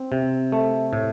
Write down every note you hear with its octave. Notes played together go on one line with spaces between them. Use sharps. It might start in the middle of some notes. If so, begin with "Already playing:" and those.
Already playing: C4
C3
A3
A2